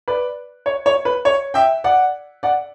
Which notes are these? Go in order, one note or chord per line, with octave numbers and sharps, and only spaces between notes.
B4 D5
C#5
C#5
B4
C#5
E5 G5
D5 F#5
D5 F#5